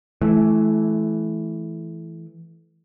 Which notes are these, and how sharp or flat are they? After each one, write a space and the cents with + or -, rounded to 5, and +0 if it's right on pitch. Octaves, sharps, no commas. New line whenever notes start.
E3 +0 A3 -30